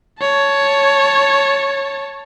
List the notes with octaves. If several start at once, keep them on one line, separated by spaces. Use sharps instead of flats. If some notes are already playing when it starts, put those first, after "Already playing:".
C#5 A5